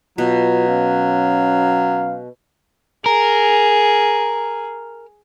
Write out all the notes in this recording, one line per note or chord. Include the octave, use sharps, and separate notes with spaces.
B2 F#3 F4
C#4 F5
G#4 A#4